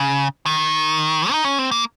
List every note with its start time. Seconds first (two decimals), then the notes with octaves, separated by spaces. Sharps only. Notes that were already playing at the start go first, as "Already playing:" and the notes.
Already playing: C#3
0.46 D#3
1.31 D#4
1.44 C#4
1.59 C4
1.71 A#3